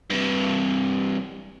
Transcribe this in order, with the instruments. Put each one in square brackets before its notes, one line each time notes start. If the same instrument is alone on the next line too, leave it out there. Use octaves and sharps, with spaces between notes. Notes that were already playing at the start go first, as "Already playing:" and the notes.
[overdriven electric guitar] G2 C3